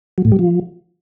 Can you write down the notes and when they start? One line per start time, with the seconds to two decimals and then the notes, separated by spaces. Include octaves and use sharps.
0.18 F#3
0.25 A2
0.32 G3
0.39 F3